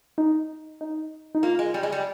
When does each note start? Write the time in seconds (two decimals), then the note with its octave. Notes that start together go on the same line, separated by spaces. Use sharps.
0.18 D#4
0.81 D#4
1.35 D#4
1.43 A#3 F4
1.59 G#3
1.74 G3
1.83 G#3
1.92 G3